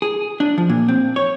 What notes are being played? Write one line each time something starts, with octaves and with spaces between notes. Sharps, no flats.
G#4
D4
F3
A#2
C4
C#5